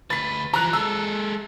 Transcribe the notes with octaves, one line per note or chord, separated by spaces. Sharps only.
D2 B4 A6 B6
E3 F3 A#5 F#6
G#3 A4 E6